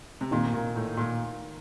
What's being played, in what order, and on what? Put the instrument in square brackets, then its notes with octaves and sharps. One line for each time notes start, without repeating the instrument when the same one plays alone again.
[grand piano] C3
[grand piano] A#2 [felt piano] D#3 A#3 D#4
[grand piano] A#2
A2
A#2